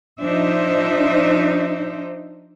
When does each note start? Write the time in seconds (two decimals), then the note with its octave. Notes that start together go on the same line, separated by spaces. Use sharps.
0.22 F3 D4 D#4 C5 E5